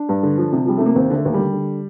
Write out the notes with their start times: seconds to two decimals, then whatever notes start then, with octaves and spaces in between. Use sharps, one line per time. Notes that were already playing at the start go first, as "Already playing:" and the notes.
Already playing: D4
0.09 G2
0.23 D3
0.38 F3
0.52 C3
0.66 F3 G3
0.78 C3 A3
0.86 A#3
0.95 D#2 C4
1.10 D3 A3
1.25 D#2
1.34 G3
1.39 D3
1.53 D3